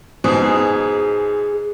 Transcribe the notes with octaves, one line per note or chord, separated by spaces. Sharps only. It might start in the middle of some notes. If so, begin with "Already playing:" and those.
G#2 B2 G#4